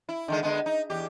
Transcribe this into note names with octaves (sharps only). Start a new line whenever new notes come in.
E4
D3 D#3 G#3
D3 G#3 B3
D#4
E2 G4